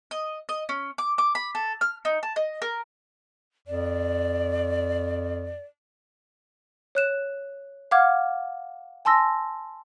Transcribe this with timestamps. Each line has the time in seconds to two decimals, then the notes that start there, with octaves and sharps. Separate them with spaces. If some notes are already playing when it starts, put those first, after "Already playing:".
0.11 D#5
0.49 D#5
0.69 C#4
0.98 D6
1.18 D6
1.35 B5
1.55 A4
1.81 F6
2.05 D#4
2.23 A5
2.36 D#5
2.62 A#4
3.68 F2 D5
6.95 C#5 F#6 E7
7.91 F5 F#5 D6 F6 G#6
9.05 G#5 A5 C6 E6 A#6